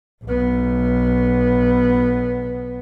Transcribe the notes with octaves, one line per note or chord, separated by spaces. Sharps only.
B1 B3